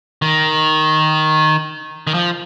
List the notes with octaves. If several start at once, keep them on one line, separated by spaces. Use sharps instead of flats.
D#3
D#3
F3